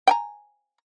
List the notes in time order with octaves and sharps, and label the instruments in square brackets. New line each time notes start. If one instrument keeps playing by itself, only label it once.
[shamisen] G5 G#5 A#5